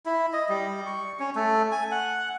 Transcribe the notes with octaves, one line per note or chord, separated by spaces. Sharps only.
E4
D#5
G3
C#6
C#4
A3
G#5
F#5